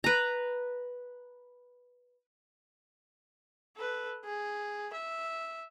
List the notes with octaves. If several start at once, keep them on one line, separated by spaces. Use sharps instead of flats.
B4 A#5
A4 B4
G#4
E5